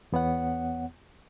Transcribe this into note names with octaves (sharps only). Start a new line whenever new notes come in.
E2 B3 C#5 F#5